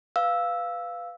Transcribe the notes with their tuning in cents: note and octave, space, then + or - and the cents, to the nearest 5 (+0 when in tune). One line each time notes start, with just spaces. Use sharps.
B4 +5 F5 +0 E6 +0